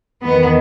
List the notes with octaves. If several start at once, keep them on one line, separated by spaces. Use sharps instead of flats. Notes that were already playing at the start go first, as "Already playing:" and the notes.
E2 D#3 B3